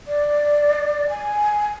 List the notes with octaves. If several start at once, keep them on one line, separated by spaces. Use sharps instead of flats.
D5
G#5